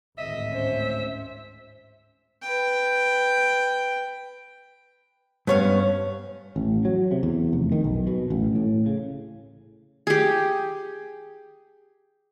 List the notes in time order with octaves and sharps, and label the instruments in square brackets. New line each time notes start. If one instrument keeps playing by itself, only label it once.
[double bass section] G#1 D2 A2 [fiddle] D#5 [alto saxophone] E5
[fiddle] C#4 C5
[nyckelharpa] B4 G5
[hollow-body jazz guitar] G2 [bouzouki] B3 C#4 F5
[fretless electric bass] A1
F#3
C3
E2
F1
D#3
B1
B2
A1
A2
C#3
[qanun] G4 G#4